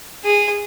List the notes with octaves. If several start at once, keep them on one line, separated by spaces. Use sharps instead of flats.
G#4